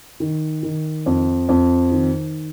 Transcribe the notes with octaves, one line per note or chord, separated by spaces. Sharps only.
D#3
D#3
F2
F2
D#3